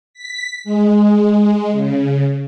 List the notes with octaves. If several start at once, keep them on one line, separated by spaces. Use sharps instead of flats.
B6
G#3
C#3